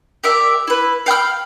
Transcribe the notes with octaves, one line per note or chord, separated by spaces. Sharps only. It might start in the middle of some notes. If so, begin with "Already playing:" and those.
G4 A#4 D5 E5
E4 B4
F5 G5 B5 F6